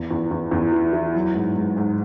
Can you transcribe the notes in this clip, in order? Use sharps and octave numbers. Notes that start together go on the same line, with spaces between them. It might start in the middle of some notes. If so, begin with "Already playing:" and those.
Already playing: E2
E2
E2
E2
E3
E3
F#3
G#2
G#2
G#2